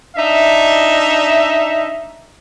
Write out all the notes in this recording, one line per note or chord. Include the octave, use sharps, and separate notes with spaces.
D4 D#4 E5